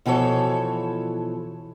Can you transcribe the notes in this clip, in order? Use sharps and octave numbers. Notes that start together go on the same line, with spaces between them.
B2 E3 F3 A4 C#5